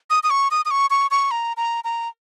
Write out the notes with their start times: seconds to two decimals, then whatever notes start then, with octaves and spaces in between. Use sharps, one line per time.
0.10 D#6
0.23 D#6
0.30 C#6
0.51 D#6
0.65 D#6
0.71 C#6
0.90 C#6
1.11 C#6
1.31 A#5
1.57 A#5
1.84 A#5